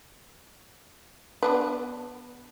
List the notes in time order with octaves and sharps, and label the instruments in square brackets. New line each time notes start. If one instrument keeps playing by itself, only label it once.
[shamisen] B3 D4 B4